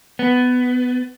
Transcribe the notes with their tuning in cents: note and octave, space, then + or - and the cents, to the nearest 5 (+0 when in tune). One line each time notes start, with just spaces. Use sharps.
B3 +15